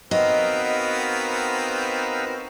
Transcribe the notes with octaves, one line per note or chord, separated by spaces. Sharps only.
B3 C4 D#4 F#4 A#4 B4 D#5 F5